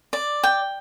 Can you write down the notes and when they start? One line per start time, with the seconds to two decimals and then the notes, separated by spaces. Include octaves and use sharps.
0.13 D5
0.43 G5